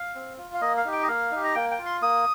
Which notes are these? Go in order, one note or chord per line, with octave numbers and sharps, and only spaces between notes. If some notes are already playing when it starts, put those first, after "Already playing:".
Already playing: F5
C4
F4
F5
A#3 D#5
F5
D#4 G4
G5
D#5
A#3 F5
D#4 G4
A#5
A#3 G5
G5
F4
C6
A#3 D#6